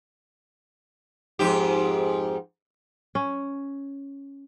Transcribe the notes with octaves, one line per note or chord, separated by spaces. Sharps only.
F2 G#2 G4
C#4